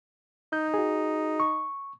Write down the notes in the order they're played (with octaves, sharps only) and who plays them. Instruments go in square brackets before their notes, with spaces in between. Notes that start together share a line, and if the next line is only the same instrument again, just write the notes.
[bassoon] D#4 [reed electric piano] G6
[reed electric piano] F#4 G#4
C#6